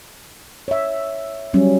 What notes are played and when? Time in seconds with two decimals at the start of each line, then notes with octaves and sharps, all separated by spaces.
0.68 C#5 E5
1.54 F#3 G3 C#4